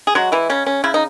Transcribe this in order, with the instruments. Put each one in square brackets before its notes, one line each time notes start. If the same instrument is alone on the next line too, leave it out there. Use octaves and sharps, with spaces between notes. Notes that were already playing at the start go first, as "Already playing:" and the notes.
[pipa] G#4
F#3 G#3 F#4
E3 E4
C#3 C#4
C#4
C#3 E4
D#4